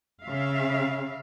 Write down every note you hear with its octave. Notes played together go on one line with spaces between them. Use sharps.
C#3 E5 F5